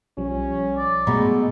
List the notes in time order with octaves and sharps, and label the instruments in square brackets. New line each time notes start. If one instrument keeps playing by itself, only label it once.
[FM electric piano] B1 F3 G3 [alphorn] C#4
[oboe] D5
[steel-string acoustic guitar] B2 A3 [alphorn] G#3 [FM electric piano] A#5 B5